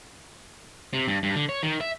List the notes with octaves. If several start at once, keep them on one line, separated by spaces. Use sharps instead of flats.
C3
G2
G2
D3
C#5
D#3
E5